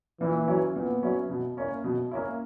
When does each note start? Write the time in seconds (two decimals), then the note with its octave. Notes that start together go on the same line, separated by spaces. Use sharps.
0.20 A#2 E3
0.48 F#3 C#4 E4
0.75 A#2 B3
1.02 F#3 C#4 E4
1.29 B2
1.57 A#3 C#4 E4
1.84 B2
2.11 A#3 C#4 E4